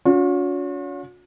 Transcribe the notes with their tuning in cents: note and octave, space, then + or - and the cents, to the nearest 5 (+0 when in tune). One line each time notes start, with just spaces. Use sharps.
C#4 +40 F#4 -45